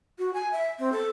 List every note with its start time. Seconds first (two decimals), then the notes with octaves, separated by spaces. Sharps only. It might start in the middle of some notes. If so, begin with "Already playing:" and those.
0.19 F#4
0.34 G#5
0.52 E5
0.79 C4
0.92 A4